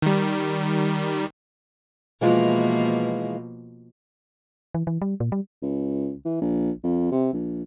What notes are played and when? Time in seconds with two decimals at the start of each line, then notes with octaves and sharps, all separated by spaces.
0.02 D#3 G3
2.21 B2 E3 F3 G#3 A#3 F4
4.75 E3
4.87 E3
5.02 G3
5.20 A#2
5.32 G3
5.62 C#2
6.25 E3
6.41 A#1
6.84 F2
7.12 C3
7.33 A#1